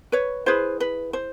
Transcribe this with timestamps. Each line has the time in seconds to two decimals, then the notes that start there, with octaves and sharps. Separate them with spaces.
0.12 B4 C#5
0.46 E4 G#4 B4 C5
0.80 B4
1.13 C5